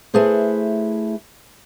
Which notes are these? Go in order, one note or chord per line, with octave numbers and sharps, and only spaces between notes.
A3 E4 G#4 B4 C5